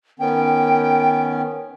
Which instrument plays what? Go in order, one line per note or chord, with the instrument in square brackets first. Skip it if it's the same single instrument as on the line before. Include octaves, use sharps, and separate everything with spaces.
[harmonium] D#3 B3 C#4 [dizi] G5